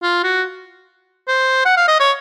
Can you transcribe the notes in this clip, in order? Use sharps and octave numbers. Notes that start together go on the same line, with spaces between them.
F4
F#4
C5
F#5
F5
D#5
C#5